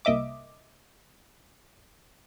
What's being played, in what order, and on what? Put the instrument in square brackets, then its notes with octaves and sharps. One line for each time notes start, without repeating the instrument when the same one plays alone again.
[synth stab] C2 A#3 D#5 E5 D6